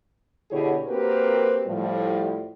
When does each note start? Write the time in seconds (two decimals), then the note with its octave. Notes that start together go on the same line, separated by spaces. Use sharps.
0.51 B2 D3 E4 G4 G#4 C#5
0.87 A#3 C4 F#4 G4 A#4 B4
1.67 A2 F3 G3